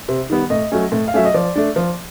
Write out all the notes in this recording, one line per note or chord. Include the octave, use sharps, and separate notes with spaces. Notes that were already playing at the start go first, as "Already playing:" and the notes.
C3
D#3 G3 B3
A2 D#5
F#3 A3 C#4
A2
F5
F#3 A3 C#4 E5
D#5
F3 D5
A3 D4
F3